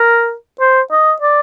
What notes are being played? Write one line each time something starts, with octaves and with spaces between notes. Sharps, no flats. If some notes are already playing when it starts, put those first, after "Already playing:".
Already playing: A#4
C5
D#5
D5